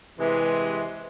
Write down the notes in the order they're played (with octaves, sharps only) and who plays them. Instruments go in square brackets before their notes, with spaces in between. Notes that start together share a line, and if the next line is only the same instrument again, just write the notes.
[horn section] C3 E3 G#3